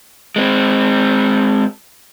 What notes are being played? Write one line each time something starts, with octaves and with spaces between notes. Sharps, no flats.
G#3 C4